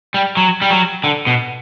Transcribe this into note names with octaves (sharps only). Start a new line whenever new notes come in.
G3
F#3
G3
F#3
D3
B2